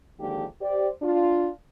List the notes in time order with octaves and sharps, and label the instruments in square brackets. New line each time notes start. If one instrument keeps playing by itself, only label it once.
[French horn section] D3 D#3 F3 G#3 A#3 G4
G4 C5 D5
D4 F4